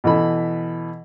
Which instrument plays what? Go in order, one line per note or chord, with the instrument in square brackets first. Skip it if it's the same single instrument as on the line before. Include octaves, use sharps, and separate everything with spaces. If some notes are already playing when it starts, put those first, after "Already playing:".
[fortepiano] B2 E3 A4 B5